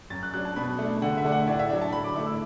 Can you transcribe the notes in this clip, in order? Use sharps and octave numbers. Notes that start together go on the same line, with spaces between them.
F#2 A6
F#6
F#3 D4 F#6
A5
B2 B5
A3 D4
D3 F#5
E5
A3 D4
F#5
A2 D5
E5
F#3 D4
A5
D3 B5
D6
A3 E4 D6
E6